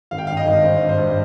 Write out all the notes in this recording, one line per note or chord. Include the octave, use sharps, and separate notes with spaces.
G#1 F5
G5
G2 F5
D#5
G#1
G#1 C5
G2
C5
G2